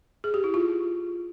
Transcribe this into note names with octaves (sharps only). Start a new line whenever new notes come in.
G#4
G4
E4
F4